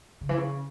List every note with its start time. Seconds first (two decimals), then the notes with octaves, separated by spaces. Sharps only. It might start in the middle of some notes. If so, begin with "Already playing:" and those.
0.21 C#3
0.29 E3
0.38 C#3